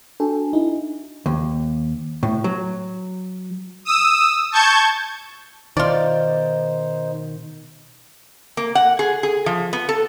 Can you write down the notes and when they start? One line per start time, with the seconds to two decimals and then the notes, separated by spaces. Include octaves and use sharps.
0.20 D4 F#4 A4 G#5
0.53 D#4 E4
1.26 D#2
2.23 A2
2.44 F#3
3.85 D#6 E6
4.52 A5 C#6 G6 G#6
5.77 B2 D#3 D#4 F4 C5 D5
8.57 A#3
8.75 F#5
8.99 G#4
9.23 G#4
9.46 F3
9.73 B3
9.89 A4